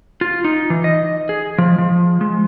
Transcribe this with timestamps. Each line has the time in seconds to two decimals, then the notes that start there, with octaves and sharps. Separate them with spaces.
0.21 F4
0.44 D#4
0.70 E3
0.84 D#5
1.29 G#4
1.58 F3
1.78 F3
2.21 G#3